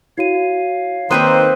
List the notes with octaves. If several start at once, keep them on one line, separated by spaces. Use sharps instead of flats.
E4 F#4 C#5 F5 D#7
D#3 A#3 C4 B4 C5 D#6 F#6 D#7